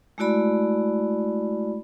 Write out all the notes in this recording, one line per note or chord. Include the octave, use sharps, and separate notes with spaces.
G#3 A3 E4 F#4 D5 B5